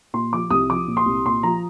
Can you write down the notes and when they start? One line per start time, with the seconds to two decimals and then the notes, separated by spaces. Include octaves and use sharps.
0.14 A#2 C6
0.33 F3 D6
0.51 C2 D#6
0.70 F3 D6
0.88 A#2
0.97 C6
1.06 C2
1.25 A#2 C6
1.43 F3 A#5